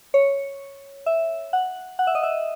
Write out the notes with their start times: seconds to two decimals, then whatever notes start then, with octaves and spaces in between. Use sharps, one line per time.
0.14 C#5
1.06 E5
1.53 F#5
1.99 F#5
2.07 E5
2.15 D#5
2.23 E5